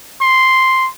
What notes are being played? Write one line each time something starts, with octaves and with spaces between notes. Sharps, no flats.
C6